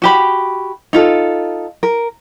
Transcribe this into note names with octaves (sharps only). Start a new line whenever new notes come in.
F#4 G4 B5
D#4 F4 A4
A#4